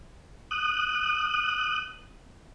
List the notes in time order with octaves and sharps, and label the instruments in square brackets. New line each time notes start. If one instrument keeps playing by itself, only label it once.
[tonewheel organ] D#6 F#6